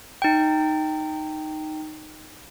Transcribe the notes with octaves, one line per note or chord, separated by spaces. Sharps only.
D#4 G5